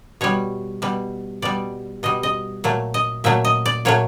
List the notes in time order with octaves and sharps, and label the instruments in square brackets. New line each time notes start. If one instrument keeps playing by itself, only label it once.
[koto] B2 G3 C#5
B2 G3
B2 G3 D5
B2 G3 D#5
D#5
A#2 F#3 A3
D#5
A#2 F#3 A3 E5
D#5
D5
A#2 F#3 A3 C#5